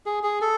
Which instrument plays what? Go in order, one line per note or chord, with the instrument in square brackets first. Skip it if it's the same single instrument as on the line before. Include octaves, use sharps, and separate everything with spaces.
[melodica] G#4
G#4
A4